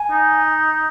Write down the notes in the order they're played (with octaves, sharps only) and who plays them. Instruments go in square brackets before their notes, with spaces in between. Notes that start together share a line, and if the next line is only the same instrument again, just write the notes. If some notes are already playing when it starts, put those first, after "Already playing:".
Already playing: [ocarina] G#5
[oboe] D#4